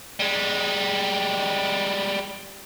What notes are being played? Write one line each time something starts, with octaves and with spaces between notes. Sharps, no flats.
G3 G#3